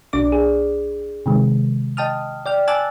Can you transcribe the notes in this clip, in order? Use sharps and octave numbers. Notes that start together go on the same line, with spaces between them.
B1 D4 D5 D6
G#4
C3 D#3 G#3
D#5 G5 A5 D#6 F6
D5 G5 F6
G#5 A5 D6 E6 F#6 A6